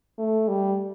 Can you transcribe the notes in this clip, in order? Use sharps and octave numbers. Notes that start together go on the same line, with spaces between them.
A3
G3